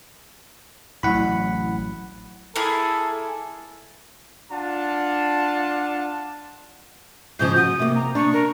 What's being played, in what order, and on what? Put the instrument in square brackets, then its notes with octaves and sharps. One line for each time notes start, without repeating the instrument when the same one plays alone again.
[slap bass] A1 F#3 [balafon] E4 [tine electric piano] F#5 B5
[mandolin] A#3 E4 G#4 [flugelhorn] A4
[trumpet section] D4 F4 F#5 A5
[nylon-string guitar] G#2 C#3 F3 [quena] G6
[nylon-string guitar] F#4 [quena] D#6
[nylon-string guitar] C3 A#3
[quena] A#5
[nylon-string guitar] D4 [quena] C#6
[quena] A#4